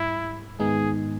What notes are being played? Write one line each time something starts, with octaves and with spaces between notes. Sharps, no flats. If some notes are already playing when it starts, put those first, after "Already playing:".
Already playing: G#2 G3 E4
G#2 D#3 G#3 B3 D#4 G#4